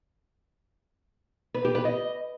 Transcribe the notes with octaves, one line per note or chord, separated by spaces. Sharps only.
B4
G4
B4
D#5